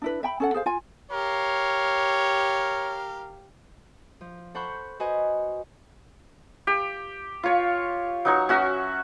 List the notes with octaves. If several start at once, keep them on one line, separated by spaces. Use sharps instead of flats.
D4 E4 B4
E5 G5 B5
C#4 A4 F#5
G#4 C5 F5
F4 G#5
G4 A#4 C#5 F5
F3
A4 C5 F#5 B5 C#6 G6
F#4 B4 C5 D#5 G#5
G4
F4 C#5
F#3 D#4 C#5
C#4 F#4 E5